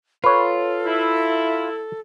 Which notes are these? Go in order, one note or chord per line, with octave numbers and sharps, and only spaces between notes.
F4 A4 B4 C#5
E4